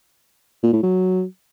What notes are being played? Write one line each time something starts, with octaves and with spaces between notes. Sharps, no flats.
A#2
A2
F#3